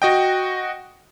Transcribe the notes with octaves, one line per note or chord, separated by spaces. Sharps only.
F#4 D#5 G5